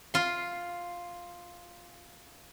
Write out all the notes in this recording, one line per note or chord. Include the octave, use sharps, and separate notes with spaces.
F4 C6